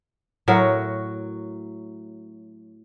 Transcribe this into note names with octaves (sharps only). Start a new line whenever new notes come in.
A2 F#3 F#4 A#4